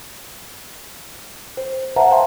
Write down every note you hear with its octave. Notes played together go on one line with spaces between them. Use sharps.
C5
B4 C5 E5 F#5 A5 A#5
E5 F5 G5 A5 C6